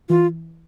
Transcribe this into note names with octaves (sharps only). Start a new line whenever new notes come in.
E3 F4